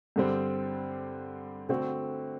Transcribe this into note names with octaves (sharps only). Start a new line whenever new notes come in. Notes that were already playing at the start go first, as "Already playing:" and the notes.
G2 D3 G3 C4
D3 A3 C4 F#4